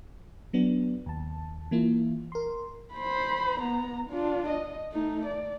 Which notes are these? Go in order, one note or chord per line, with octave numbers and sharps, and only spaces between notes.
F#3 B3 D4
D#2 A5
E3 A#3 E4 F4
A#4 C6
C5 B5
B3 A#5
D4 F4
D#5
A3 D#4
D5